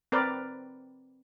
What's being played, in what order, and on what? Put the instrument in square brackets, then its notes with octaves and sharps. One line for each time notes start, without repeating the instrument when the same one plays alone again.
[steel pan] C4 A#4 B4 D5